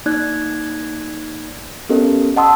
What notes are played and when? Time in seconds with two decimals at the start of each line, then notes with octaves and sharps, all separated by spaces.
0.06 A#3 D#4 D5 F#6 G#6
1.89 B3 C#4 G4 A4 A#4 D#5
2.36 D#5 F#5 A5 C6 D#6 E6